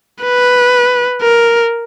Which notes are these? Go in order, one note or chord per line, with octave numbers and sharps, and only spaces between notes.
B4
A#4